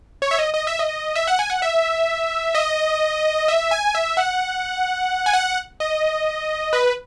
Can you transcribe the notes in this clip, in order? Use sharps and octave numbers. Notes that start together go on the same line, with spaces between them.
C#5
E5
D#5
D#5
E5
D#5
E5
F#5
G#5
F#5
E5
D#5
E5
G#5
E5
F#5
G#5
F#5
D#5
B4